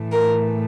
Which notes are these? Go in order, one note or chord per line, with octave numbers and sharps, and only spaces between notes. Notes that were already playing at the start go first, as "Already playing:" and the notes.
Already playing: A2 E3 A3
A#4